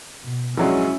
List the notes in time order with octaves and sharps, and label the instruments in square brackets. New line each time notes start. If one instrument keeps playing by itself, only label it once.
[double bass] B2
[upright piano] A#1 F#3 G#3 [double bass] C#4 E4